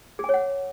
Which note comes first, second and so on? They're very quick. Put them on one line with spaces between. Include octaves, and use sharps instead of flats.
G#4 G#5 C#5 F#5